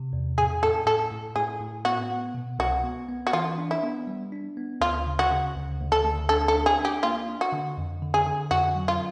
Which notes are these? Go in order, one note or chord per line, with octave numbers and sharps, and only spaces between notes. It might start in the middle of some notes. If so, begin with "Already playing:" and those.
Already playing: C3
E2
A2 G#4
A2 A4
A2 A4
A2
A2 G#4
A2
B3 F#4
B3
B2
C2 F#4
B3
B3
F#4
E3 F4
D4
E4
B3
G3
D4
B3
D2 F4
C#3
F#4
C#3
D2
D2
A4
D2
D4 A4
A4
D4
G#4
D4
G4
A#3 F4
D4
F#4
D3
F2
D3
G#4
D3
F2 F#4
F#3
F4